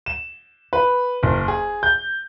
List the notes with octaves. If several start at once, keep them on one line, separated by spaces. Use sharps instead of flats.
E7
B4
F#1
G#4
G6